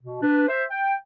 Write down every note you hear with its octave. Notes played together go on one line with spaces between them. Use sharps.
B2
D4 B4
C5 E5
G5